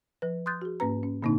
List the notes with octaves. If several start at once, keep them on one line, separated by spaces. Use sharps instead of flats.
F3 B4
C6 D#6 F#6 G6 A6
F#4 G#4
G#2 A#3 C#4 B4 A#5
C#4
A#2 D3 A#3 C4 D4 D#4